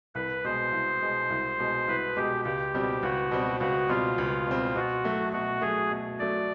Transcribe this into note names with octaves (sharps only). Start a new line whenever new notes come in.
C2 B4
B2 G#3 C5
C2
B2 G#3
C2
B2 G#3
C2 B4
B2 G#3 G4
C#2 G4
B2 G3 C4
C#2 F#4
B2 G3 C4
C#2 F#4
B2 G3 C4 F4
C#2
B2 G3 C4
B2 F#4
F#3 A3
B2 F#4
F#3 A3 G#4
B2
F#3 A3 D5